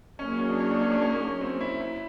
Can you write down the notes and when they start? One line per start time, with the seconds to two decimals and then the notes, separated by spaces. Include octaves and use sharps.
0.19 F#3 A#3 C#4 D#4 G#4 C#5
0.39 C#4
0.49 D4
0.60 C#4
0.71 D4
0.81 C#4
0.91 D4
1.02 C#4
1.41 C4
1.61 E4
1.81 E4